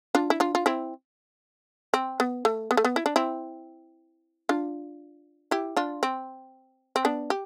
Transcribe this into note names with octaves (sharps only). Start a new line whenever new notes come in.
D4 F4
E4
D4 F4
F4
C4 E4
C4
B3
A3
B3
A3
B3
E4
D4
C4 E4
D4 F4
E4 G4
D4 F4
C4
C4
B3 D4
G4